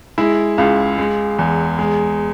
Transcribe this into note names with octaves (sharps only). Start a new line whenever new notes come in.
G#3 E4
C#2 F4
G#3
E2
G#3